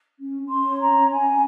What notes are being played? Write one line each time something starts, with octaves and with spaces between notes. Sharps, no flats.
C#4
C#4
C6
C#5
A#5
C#4
C#4 G#5
C#4